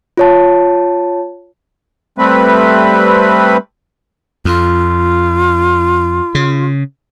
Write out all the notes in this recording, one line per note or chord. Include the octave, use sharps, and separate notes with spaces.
F4 C#5 A5
G3 A3 C4 B4
F2 F4
C#3